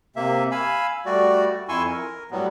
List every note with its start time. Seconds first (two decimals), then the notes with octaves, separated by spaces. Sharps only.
0.16 C3 A#3 E5
0.51 F5 G#5 B5 E6
1.06 G3 A3 F#4 D5
1.69 F2 E4 G#5 C6 C#6 E6
1.89 A#4
2.31 A2 F#3 G3 B3